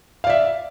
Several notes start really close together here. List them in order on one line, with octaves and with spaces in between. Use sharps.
F5 D5 E5